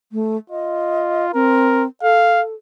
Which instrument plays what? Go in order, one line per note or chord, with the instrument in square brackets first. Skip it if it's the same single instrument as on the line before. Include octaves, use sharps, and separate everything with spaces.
[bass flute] A3
[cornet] F4 [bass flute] D#5
[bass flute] C4 [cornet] A#4
[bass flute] A4 [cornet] F5